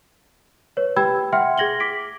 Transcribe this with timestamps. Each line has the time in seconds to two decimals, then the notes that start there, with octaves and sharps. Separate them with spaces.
0.77 B4 C#5
0.96 G4 B4 G5 B5 E6 G#6
1.32 E5 F#5 G5 C6 F6 C#7
1.58 G#4 G#6 A#6 F#7 G7
1.80 D6 B6 D7